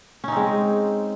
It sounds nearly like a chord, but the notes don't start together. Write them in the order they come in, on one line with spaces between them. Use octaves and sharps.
C#4 D#4 C4 G#3